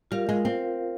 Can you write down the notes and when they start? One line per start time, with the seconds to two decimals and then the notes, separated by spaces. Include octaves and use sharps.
0.11 G3 F4 A#4 F5
0.29 G#3
0.45 C4